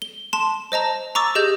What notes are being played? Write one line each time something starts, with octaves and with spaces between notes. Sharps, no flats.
G7
A5 C6 E7
C5 D#5 A5 A#5
A#5 C#6 D6 E6 A6
G4 G#4 D#5 G6